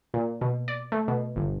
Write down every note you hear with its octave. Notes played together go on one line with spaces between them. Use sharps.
A#2
B2
D5
A3
B2
G1